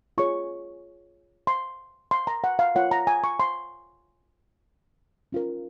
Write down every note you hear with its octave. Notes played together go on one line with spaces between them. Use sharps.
F4 G#4 C#5 C#6
C6
C6
A#5
F#5
F5
F4 A#4 C#5 F#5
A#5
G#5
C#6
C6
C#4 F4 A#4